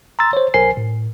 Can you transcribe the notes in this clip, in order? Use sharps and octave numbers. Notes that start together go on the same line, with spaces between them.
A#5 C6 E6 A6
C5 C#5
B1 A#4 C5 G#5 C7
A2